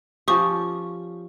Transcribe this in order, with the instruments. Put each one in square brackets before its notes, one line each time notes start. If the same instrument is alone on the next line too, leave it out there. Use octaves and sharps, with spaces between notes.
[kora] F3 C#4 G4 [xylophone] C#6 D#6